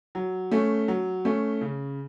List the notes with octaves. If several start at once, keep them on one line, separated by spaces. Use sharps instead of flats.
F#3
A3 C#4
F#3
A3 C#4
C#3